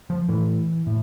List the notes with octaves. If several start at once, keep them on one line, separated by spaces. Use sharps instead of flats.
F3
A2 E3
A2